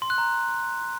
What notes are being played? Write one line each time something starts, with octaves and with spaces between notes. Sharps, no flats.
C6
F#6
A#5